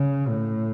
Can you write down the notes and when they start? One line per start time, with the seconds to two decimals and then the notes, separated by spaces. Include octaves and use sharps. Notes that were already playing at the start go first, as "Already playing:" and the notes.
Already playing: C#3
0.28 A2